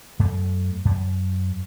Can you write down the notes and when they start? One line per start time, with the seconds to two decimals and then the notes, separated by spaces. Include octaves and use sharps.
0.19 F#2 A3
0.85 F#2